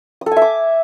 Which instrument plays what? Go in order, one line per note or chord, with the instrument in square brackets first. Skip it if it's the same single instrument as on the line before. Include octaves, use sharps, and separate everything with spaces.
[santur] D#6
A4
G#5
E5
D6